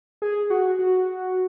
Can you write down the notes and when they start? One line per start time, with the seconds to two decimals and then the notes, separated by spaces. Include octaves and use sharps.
0.22 G#4
0.50 F#4
0.79 F#4